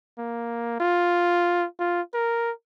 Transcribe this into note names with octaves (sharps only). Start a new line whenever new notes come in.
A#3
F4
F4
A#4